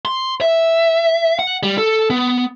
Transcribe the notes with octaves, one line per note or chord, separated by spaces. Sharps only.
C6
E5
F#5
G3
A4
B3